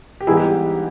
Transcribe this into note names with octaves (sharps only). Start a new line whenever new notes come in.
G4
G#2 E3 G3 B3 D#4 E4 G#4
G4